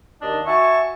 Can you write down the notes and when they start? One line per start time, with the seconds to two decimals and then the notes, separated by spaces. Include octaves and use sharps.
0.21 D#2 D4 D#5
0.46 F#4 E5 G#5 A5 C#6